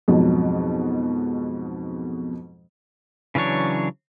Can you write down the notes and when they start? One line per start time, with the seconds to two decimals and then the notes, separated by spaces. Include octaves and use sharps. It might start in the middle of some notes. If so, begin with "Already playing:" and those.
0.08 F2 G#2 B2 F#3
3.35 C#3 E3 F#3 D4 C#5